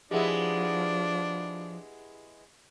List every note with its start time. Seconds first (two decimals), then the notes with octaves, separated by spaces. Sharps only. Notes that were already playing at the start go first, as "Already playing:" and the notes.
0.11 F3 G#3 B3 D4 E4 G4 G#4